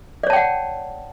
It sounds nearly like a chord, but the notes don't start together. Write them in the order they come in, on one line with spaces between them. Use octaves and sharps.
D5 C#5 A5 G5 F#5